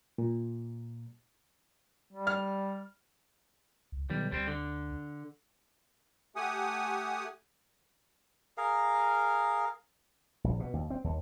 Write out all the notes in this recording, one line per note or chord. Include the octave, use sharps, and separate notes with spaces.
A#2
G3
F6
C#2
B1 D#3 G3
D2 G3 C4
D3
A3 G4 F#5 G#5 D#6
G#4 A#4 F5
A#1
B2
D#2
C4
D#2